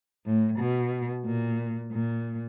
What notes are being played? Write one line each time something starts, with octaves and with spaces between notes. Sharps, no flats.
A2
B2
A#2
A#2